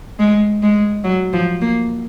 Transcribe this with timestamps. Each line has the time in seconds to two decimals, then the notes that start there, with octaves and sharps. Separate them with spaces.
0.19 G#3
0.63 G#3
1.04 F#3
1.33 F3
1.61 A#3